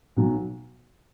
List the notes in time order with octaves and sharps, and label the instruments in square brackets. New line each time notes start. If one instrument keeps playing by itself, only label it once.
[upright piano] B1 B2 F#3